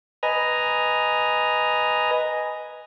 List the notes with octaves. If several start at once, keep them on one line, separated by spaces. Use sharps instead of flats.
B4 D#5 G#5 A#5